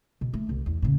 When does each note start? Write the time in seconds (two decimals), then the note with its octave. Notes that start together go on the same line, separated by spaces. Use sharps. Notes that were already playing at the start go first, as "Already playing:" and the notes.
0.21 B2
0.34 A3
0.49 C2
0.66 E2
0.82 A2 C#3